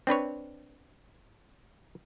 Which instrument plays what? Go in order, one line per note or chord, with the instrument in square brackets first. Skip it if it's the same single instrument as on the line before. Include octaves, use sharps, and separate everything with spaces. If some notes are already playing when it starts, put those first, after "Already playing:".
[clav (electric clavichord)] C4 D4 B4 C#5